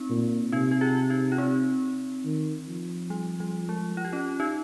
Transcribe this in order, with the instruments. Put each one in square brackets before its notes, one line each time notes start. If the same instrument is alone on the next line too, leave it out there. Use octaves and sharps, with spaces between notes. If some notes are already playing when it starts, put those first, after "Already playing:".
Already playing: [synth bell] C4 D#4
[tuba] A#2
[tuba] C3 [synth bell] D#4 G4
[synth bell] G4
F4 G#4
D#4 G4
F4
C4 D#4
[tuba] D#3
F3
[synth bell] G3
G3
G#3
F4
G4
C#4 F4
D#4 G4